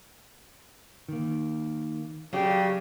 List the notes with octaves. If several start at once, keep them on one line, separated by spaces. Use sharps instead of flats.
D#3 A#3
C#3 F#3 G4 D5